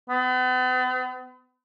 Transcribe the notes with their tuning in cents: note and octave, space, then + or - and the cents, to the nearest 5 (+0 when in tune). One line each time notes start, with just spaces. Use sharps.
B3 +45